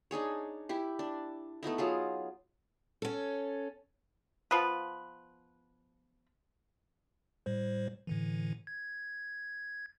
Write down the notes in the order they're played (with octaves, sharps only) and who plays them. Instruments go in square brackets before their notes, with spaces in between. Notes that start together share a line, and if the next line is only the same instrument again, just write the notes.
[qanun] D4 D#4 G#4 C#5
E4 G4
D4
A3 B3 D#4 E4
F#3 F4 G#4
[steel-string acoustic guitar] C#4 A4
[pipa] F3 B3 F4 B4
[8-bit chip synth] A2 G3 C5
A2 D3 E3
G#6